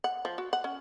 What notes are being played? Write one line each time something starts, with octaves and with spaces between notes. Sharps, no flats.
F#5
F3
F#4
F#5
C#4